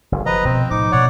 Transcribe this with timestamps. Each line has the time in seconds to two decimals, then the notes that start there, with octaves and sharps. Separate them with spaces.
0.12 F#1
0.26 F3 B4 D#5 A#5
0.45 B2 D3 C4
0.71 A2 D#4 D6
0.92 B2 C#5 D5 F#5